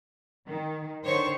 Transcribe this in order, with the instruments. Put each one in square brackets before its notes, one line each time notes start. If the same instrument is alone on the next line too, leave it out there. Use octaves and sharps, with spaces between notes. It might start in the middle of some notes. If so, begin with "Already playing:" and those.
[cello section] D#3
[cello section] D3 D#3 C5 [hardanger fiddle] C#5 C#6